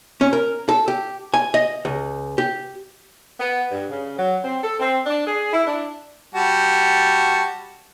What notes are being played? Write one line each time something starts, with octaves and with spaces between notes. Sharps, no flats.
C#4
A#4
A4
G4
G#5
D#5
C#2
G4
B3
G2
C#3
F#3
C4
A4
C4
D4
G#4
E4
D4
G3 F#4 A5